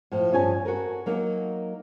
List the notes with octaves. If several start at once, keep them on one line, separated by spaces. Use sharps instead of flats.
A2 F3
G2 F3 C#4 C#5 G#5 A5
F#4 A4 A#4 G#5
F#3 A#3 D#4